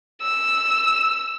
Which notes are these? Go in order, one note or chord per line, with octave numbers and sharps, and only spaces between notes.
E6